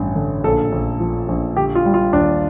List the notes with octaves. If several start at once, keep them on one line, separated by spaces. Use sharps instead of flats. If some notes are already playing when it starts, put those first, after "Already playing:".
Already playing: A1 G2
D3
A#1 A4
A#1
F3
A#1
D3 G4
F4
G3
F4
D#2 D4